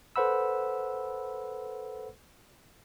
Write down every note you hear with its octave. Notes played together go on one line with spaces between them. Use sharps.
A4 B4 C5 F#5 B5 E6